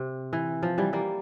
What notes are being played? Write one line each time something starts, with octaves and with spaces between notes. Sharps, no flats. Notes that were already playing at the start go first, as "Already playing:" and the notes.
Already playing: C3
E3
F3
E3 G3
G3 A#3